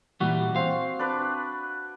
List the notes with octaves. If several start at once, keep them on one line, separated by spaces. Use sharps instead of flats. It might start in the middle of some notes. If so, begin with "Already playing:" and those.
A#2 E3 G3 F#4
C4 F5
D4 B4 D5